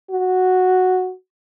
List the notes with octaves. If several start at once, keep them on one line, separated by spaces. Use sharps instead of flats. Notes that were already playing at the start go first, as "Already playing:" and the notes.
F#4